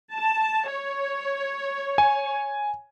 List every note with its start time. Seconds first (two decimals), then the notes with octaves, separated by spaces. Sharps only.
0.13 A5
0.70 C#5
1.98 G#5